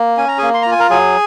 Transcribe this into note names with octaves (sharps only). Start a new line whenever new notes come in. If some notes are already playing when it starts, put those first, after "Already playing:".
Already playing: A#3
C#4 G#5
A#5
A#3 G#4 G#5
C6
A#5
F4
G#5
A#4 A#5
F#3 G#4 G#5